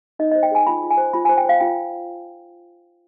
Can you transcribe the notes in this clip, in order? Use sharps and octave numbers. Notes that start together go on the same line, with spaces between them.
D#4 D#5
D#5
C5
G5
G#4 G#5
F4 B5
F4
G#5
C5
F4 B5
G#5
C5
G5
C5 F5
F4 G5